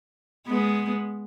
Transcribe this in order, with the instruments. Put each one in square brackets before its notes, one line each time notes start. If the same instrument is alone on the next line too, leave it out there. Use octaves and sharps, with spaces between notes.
[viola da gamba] G#3 B3